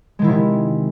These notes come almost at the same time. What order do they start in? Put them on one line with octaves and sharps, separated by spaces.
G#3 D#3 E4 F3 C3